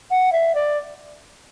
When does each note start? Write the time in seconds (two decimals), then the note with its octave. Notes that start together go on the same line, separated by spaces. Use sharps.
0.11 F#5
0.33 E5
0.55 D5